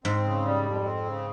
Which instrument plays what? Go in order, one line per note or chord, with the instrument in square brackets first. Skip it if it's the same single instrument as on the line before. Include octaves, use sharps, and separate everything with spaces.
[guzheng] G#2 [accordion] C4
[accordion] C#3
G3
F2
C4
C#3